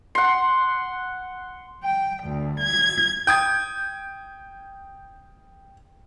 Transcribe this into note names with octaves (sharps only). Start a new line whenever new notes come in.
F#5 C6
G5
D2
G#6
G5 D#6 G6 G#6